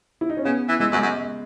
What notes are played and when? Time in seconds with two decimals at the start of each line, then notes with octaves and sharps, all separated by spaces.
0.21 E4
0.29 D#4
0.37 C#4
0.45 C#3 B3
0.68 E3
0.79 E3 G#3
0.92 F#2
0.97 G#3
1.02 F#2